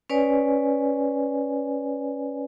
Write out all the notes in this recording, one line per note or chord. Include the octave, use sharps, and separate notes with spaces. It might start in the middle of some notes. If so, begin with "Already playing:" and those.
C#4 B4 C#5 D5 G#5